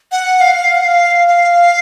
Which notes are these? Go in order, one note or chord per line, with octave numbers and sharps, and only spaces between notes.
F#5
F5
F#5
F5
F5